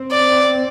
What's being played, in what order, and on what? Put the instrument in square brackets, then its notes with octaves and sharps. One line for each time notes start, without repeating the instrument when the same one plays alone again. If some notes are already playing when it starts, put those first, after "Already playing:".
Already playing: [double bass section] C4
[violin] D5